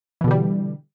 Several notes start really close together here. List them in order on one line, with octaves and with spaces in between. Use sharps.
E3 B2 D3 G3